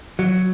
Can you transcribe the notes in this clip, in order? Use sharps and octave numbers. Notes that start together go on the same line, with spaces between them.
F#3